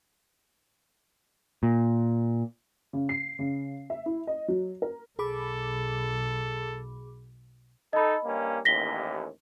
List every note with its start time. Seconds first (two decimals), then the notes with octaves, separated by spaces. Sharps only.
1.63 A#2
2.93 C#3
3.09 C7
3.39 C#3
3.90 E5
4.06 E4
4.27 D#5
4.48 F#3
4.82 A#4
5.19 B1 G#4 A4 B5 D6
7.93 D#4 A4 D#5 B5
8.25 G2 A#3 C#4
8.65 A1 D#2 A#6 B6 G7